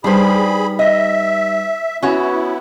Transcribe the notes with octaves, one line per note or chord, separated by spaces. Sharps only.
G3 D4 D#4 G#4 B4 C5 B5
D#5 E5
B3 C#4 E4 F#4 C#5